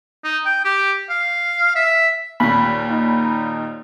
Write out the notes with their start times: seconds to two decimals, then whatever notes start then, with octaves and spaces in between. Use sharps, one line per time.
0.24 D#4
0.46 G5
0.65 G4
1.10 F5
1.76 E5
2.40 D#2 A#2 B5
2.90 D#4